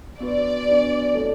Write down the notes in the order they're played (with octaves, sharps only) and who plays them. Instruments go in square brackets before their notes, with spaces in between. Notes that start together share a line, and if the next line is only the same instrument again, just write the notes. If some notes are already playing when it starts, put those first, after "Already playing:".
[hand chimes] B3 D4 F#4 B4 [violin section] D5
[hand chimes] B3 D4 F#4 B4
A3 C4 E4 A4 C#5